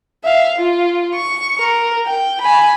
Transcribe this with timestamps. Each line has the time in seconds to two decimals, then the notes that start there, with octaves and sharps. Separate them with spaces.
0.24 E5 F5
0.59 F4
1.15 C#6
1.60 A#4
2.06 G5
2.41 G#5 B5